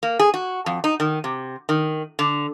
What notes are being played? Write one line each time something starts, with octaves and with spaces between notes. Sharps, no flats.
A#3
G#4
F#4
F2
D#4
D#3
C3
D#3
D3